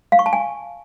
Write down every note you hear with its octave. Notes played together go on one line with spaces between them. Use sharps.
F5
C#6
A5
G#5